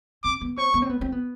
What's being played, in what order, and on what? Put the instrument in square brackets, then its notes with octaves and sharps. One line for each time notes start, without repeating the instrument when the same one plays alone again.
[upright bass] C4 [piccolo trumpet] D6
[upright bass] B3
[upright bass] C4 [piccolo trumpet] C#6
[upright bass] B3
C4
B3
C4
B3